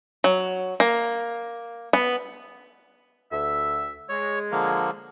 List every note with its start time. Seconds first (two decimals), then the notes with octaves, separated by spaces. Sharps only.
0.24 F#3
0.80 A#3
1.93 B3
3.31 D2 E5
4.09 G#3 C#5
4.52 D3 F3 A#3